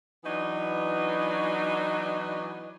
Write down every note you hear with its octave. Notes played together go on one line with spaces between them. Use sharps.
E3 F#3 B3 D4 D#4